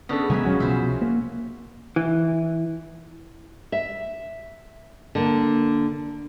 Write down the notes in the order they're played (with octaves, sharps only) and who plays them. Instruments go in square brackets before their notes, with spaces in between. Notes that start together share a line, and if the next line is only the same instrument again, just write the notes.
[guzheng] C#3 B4 [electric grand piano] B3 D4 A4
[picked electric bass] C#3 F#3 B3 [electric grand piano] G#3 [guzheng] E5 G#5
[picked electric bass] E1 F#3 [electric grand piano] C#3 C#4 F#4
[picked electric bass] C2 B2 F3 [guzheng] C5 E5
[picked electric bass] A#3
[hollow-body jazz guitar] E3
[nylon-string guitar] E5
D3 A#3